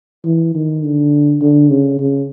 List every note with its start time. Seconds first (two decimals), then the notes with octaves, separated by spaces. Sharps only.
0.25 E3
0.55 D#3
0.83 D3
1.42 D3
1.70 C#3
2.00 C#3